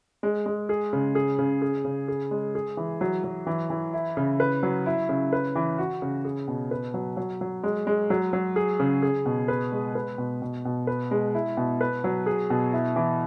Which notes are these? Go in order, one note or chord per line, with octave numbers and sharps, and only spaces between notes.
G#3
G#3
G#4
C#3
G#4
C#3
G#4
C#3
G#4
G#3
G#4
E3
F#3
F#3
E3
E3
E4
C#3
B4
F#3
E4
C#3
B4
E3
F#4
C#3
G#4
B2
B4
F#3
F#3
F#3
G#3
G#3
F#3
F#3
G#4
C#3
G#4
B2
B4
G#3
B4
B2
B2
B2
B4
G#3
E4
B2
B4
F#3
G#4
B2
E4
E3